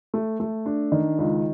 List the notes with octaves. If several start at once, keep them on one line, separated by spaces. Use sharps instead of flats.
A3
A3
D4
D#3
C#2